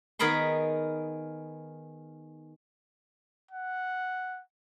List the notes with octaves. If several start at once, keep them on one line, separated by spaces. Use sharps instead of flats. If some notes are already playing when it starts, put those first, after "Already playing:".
D#3 B3 G#4 A#4 B5 C6
F#5